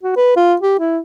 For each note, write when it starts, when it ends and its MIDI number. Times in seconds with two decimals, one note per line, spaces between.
0.03 0.15 66
0.17 0.35 71
0.36 0.55 65
0.61 0.75 67
0.79 0.99 64